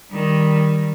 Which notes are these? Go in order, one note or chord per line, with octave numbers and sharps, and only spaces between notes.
D#3 G3